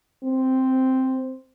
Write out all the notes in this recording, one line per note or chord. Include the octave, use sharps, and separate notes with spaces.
C4